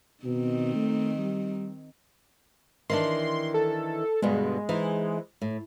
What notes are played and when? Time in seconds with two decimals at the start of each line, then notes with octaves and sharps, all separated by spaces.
0.24 B2 D#3 C4 D#4
0.75 A3
1.18 G3
2.90 D#3 E3 D4 C6
3.54 A4
4.22 G2 B2 D3 G#3
4.69 E3 D#4 C5
5.41 A2